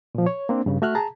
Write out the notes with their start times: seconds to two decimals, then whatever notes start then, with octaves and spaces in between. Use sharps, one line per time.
0.15 A#2 F3
0.26 C#5
0.49 A#3 C4 D4
0.66 G2 C#3
0.82 A3 F#4 E5 F6 F#6
0.95 G#4 A5 A#5